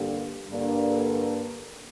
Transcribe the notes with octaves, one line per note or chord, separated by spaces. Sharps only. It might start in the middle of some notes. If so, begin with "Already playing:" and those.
Already playing: G2 D3 A#3 G4
G2 D3 A#3